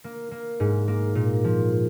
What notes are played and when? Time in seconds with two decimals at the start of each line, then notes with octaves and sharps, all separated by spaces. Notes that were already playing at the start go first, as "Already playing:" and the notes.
0.04 A#3
0.31 A#3
0.60 G#2
0.88 A#3
1.15 A#2
1.44 F3